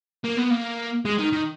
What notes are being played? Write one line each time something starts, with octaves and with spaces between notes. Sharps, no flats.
A#3
B3
A#3
G#3
D#3
D#3